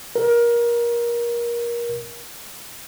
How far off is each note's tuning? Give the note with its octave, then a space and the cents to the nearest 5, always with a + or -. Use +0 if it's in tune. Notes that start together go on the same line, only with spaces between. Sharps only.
A#4 +25